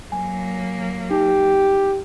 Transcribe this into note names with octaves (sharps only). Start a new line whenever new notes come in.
F#3 A#3 G#5
D#4 G4